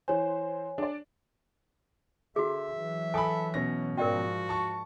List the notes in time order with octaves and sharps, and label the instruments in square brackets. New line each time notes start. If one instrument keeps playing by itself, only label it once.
[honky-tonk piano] E3 C5 [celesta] C#5 G#5
[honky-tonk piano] D4 D5
[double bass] D3 [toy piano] F#4 G#4 [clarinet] E5
[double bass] E3 F#3
[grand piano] A4 B5 [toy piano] G#5 D#6
[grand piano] B2 C#4 A#6
[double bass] G#2 F3 [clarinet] F#4 [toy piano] A#4 D5 G5
[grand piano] A5 C#6